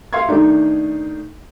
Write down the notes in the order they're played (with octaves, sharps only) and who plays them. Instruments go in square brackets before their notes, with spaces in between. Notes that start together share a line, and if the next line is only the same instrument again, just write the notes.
[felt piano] E5 F5 C6 C#6 G#6
D#3 A3 D4 D#4